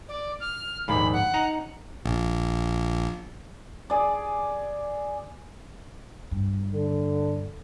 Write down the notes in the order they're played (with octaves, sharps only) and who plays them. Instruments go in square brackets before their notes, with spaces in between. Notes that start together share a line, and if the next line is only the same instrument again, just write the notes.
[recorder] D5
F6
[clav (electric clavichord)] A#1 D#2 G#2 [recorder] B5
[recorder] F#5
[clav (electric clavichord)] D#4 A#5
[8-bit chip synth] A#1
[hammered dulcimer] G#4 D5
[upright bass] G2
[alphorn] D3